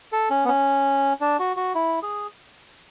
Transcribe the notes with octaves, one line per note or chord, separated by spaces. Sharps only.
A4
C#4
B3
C#4
D4
F#4
F#4
E4
G#4